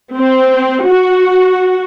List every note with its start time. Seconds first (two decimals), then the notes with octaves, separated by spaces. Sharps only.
0.15 C4
0.84 F#4